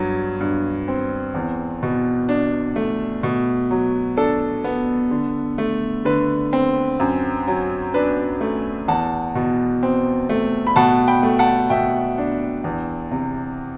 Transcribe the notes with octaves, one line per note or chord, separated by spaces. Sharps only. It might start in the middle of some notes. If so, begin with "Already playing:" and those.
Already playing: G2 F#3
G2
C4
E2
B2
D4
A3
B2
F#3
D4 A4
B3
D3
A3
D3 B4
C4
F#2
F#3
D4 B4
A3
E2 F#5 A5
B2
C4
A3
B5
B2 F#5 A5
G5 B5
A3
F#5 A5
B2 E5 G5
D4
E2
C3